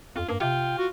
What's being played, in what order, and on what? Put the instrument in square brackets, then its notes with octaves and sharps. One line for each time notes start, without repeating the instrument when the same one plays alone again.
[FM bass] F2 [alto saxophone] F4
[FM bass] G2 [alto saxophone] A#3
[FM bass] C3 [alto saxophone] F4 [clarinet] G5
[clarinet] F#4